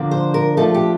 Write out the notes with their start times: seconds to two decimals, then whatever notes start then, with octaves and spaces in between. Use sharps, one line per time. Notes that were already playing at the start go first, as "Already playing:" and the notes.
Already playing: D3 F3 A#3 D4
0.11 C5
0.34 A#4
0.57 F3 A3 D4 F4 A4
0.74 G4